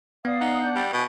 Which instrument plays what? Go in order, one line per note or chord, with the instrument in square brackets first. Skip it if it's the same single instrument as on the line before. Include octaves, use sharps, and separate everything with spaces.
[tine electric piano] B3 [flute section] D5 F5 D#6
[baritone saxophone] D#4 [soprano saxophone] F#5
[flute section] D4 G6
[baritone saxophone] G3
[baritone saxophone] B2 [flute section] G#5